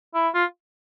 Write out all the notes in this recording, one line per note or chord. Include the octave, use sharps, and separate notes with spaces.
E4
F4